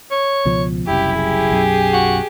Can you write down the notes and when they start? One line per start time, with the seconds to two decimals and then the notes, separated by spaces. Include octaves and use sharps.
0.11 C#5
0.45 C#2 B2 F3
0.87 F#1 C2 F#2 E4 G4
1.17 G4 G#4
1.50 B1 F#2
1.93 F#4